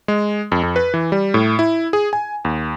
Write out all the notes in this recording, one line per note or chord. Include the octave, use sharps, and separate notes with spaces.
G#3
F2
F2
B4
E3
G3
A2
E4
G#4
G#5
D#2